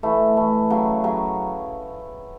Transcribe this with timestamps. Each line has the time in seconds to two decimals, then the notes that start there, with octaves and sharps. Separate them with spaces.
0.03 E3 A3
0.37 E3 A3
0.70 C#3 F#3
1.04 C#3 F#3